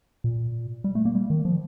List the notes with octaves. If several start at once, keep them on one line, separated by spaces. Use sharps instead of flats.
A#2
G3
A3
A#3
G3
D#3
F3